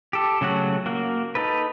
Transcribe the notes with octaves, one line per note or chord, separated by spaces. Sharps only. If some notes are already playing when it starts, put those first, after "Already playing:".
G4 A4
C#3 F#3 A3 F#4 F#5
A#3 F#4
D#4 A4 B4